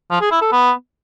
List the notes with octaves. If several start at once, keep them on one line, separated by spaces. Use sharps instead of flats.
F3
G#4
E4
A4
B3